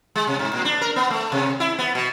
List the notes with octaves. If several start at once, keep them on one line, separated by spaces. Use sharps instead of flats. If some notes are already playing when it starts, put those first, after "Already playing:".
G#3
C3
G#2
A#2
D4
A#4
B3
A3
C3
E4
B3
B2